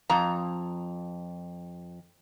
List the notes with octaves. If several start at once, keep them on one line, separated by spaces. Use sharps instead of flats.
F2 A#5